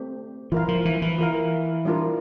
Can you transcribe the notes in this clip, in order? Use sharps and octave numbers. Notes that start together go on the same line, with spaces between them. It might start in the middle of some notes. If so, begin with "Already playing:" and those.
Already playing: A3 C4 G4
E3 F4 A#4 F5
F3
E3
E3
F4 A#4 F5
G3 D4 F4 A#4